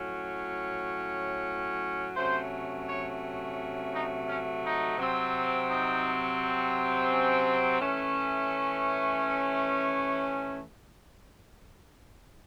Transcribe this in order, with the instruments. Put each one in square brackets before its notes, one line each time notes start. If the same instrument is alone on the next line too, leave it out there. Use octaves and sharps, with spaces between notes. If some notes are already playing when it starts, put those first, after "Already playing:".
Already playing: [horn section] A2 F#3 C#4
C3 F#3 A3 C#4 C5
C#5
D#4
C#4
D#4
C3 F#3 C4
D#4
C#4
E3 A3 C#4